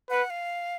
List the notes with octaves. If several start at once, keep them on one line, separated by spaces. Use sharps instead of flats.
B4 F#5
F5